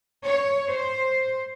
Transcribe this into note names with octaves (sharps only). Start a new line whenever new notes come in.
C#5
C5